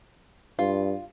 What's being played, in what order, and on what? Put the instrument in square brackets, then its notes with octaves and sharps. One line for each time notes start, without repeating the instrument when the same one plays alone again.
[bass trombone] G2 [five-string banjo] F4